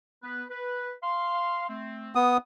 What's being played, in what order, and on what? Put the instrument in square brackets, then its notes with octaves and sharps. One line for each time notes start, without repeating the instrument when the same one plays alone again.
[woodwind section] B3 B4
B4
F5 C6
A3 C4
[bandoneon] B3 D#6